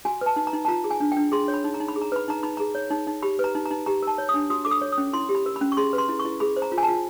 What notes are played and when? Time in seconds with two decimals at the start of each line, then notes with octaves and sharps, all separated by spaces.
0.05 F#4 G#5
0.21 B4 A5
0.36 D#4
0.47 A#5
0.53 D#4
0.65 A5
0.68 F4 A#5
0.84 G#4
0.91 G#5
1.00 D4
1.12 D4 G5
1.32 G#4 C6
1.48 C#5
1.54 B5
1.64 D#4
1.74 A#5
1.80 D#4
1.88 B5
1.96 G#4
2.02 A#5
2.12 B4 B5
2.28 D#4 A#5
2.43 D#4 B5
2.57 G#4 A#5
2.75 C#5
2.91 D#4
3.07 D#4
3.23 G4 B5
3.39 B4 A#5
3.55 D#4
3.66 D#4 A#5
3.86 G4 A#5
4.02 A#4 A5
4.18 C#5
4.29 D#6
4.34 D4
4.50 F#4 D#6
4.65 A4 D6
4.71 D#6
4.81 C#5
4.92 D#6
4.98 C#4
5.13 E4 C6
5.29 G4
5.35 B5
5.46 A#4
5.56 B5
5.61 C#4
5.72 C#6
5.77 G#4 C6
5.93 B4
5.98 C6
6.09 E4
6.19 C#6
6.25 E4
6.40 G#4 B5
6.56 C5
6.62 A#5
6.72 F4
6.78 G#5
6.83 A5
6.88 F4